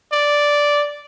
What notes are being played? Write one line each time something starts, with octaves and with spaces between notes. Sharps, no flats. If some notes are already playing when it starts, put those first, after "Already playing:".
D5